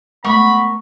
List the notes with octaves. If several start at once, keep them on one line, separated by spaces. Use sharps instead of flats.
G#3 A3 B3 A#4 F#5 B5 C#6